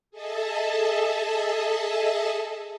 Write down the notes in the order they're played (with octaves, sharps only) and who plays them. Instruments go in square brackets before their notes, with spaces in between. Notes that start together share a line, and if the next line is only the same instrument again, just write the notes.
[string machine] G#4 A4 D#5 E5 A5